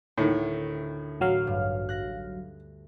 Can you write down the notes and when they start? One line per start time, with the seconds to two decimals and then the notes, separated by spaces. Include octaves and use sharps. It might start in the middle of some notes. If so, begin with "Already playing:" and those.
0.18 D2 A2 D#3 C#7
1.20 A1 F#3 F5
1.47 G2
1.89 F#6 A#6